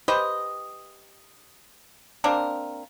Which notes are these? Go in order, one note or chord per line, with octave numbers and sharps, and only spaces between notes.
G4 B4 C5 D#5
A#3 C4 D4 A#4